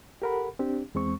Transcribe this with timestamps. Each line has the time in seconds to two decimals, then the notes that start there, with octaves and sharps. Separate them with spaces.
0.22 G4 A4 A#4 F#5 B5
0.59 C4 D4 G4
0.95 E2 G#3 C4 C#6